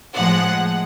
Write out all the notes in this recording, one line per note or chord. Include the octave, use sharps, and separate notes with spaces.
A2 F3 G#3 F#5